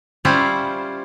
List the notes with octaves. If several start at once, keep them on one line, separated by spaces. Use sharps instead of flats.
G3 C#4 E4 F4 C5